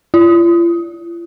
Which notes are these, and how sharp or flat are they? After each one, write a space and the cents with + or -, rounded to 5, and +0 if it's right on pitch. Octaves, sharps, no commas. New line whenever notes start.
F4 -45